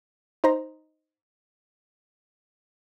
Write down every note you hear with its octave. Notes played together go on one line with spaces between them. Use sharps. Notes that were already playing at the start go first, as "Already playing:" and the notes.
D#4 C5 A#5